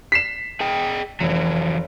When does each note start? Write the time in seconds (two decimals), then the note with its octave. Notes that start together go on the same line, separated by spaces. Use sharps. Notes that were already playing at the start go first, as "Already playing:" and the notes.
0.12 B6 C7 E7
0.60 G#4 D#5 G5
1.20 F1 E3 F#3